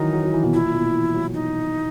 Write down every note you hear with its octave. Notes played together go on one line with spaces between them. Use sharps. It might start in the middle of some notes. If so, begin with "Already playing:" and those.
Already playing: D#3 E3 F#3 D#4
F#3
F#3
E3
B2
A#2 E4
A#2
B2
E3
F#3
D#4